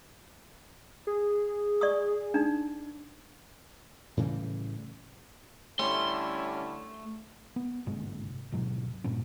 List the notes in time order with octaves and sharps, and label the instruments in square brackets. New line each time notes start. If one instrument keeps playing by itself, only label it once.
[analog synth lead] G#4
[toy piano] D5 C#6 D#6
D4 D#4
[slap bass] A2 C#3 E3 G3
[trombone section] D3 G3 E4 [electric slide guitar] A3 [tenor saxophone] C#4 [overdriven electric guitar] C6
[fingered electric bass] B3
G1 G#2 C3 G#3
D1 G#2 B2 F#3
G2 A#2 C#4